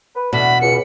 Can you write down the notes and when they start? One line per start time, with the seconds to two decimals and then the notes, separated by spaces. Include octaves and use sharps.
0.15 B4
0.33 E2 B2 D3 A3 D4 B5
0.61 C#2 C#7